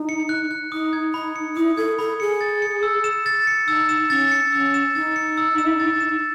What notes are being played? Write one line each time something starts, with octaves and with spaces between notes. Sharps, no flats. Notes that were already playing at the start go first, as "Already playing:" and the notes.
Already playing: D#4
C#7
F#6
F#6
D#4 D#6
G#6
D#4 B5
C#7
E4 D#6
A4 G#6
A4 B5
G#4 C#7
A6
C#7
E6
E7
A6
C#7
D#4 E6
E7
C#4 A6
C#7
C#4 E6
E7
D#4 A6
C#7
E6
E7
A6
E7